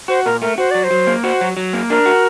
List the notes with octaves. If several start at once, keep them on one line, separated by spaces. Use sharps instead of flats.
F#4 C5
A#2 A#4
A3 A#4
F#4 C5
F#3 D5
C5
F#3
A#3
F#4 C5
F#3
F#3
A#3
D4 A#4
F#4